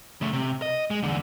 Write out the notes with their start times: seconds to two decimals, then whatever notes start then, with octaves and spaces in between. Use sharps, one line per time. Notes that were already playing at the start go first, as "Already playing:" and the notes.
0.21 C#3 A3
0.33 C3
0.62 D#5
0.90 G#3
1.02 E2 D3